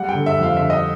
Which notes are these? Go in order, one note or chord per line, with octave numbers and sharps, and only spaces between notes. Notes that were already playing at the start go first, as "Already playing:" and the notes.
Already playing: G3 F#5
G5
D3
E5
F2 F5
D3 E5
D#5